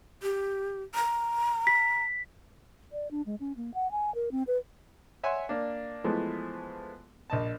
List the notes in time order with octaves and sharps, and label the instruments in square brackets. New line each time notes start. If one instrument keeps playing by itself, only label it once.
[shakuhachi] G4
A#5
[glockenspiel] B6
[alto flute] D5
D4
G#3
C#4
A#3
F#5
G#5
A#4
C4
B4
[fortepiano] C#5 E5 F#5 G#5 C6
A#3 D4
E3 F3 G#3 A3 B3
A#1 D#5 A5